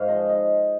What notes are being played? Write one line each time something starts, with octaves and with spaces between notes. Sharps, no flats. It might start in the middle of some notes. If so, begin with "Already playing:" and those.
Already playing: G#2 C5 F5
F3 D#5
D#5